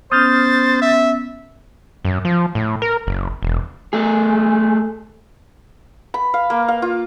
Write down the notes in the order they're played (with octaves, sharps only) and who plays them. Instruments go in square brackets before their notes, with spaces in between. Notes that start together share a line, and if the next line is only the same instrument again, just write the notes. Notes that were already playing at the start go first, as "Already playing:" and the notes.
[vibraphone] B3 C#4 [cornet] C5 [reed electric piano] D#6 F6 G6 [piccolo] A6
[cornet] E5
[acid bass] F#2
F3
A2
A#4
F#1
E1
[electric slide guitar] A3 G#4
[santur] B5
F5
A#3
F5
F4